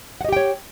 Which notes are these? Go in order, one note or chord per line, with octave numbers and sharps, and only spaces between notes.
G4 C#5 D#5 F#5 G5